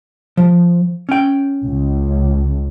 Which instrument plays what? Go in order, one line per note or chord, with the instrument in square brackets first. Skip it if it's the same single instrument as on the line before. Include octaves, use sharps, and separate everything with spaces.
[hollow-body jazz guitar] F3
C#4 G5
[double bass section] C#2